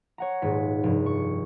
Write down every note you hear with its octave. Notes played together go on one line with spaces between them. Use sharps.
C#5 F#5 A#5
D#1 G#2 B6
F1 G2
C#6